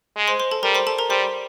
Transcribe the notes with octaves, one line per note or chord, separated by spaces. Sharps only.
G#3
C5 C6
C5 C6
A4 A5
G3 A#4 A#5
C5 C6
A4 A5
A#4 A#5
G3 C5 C6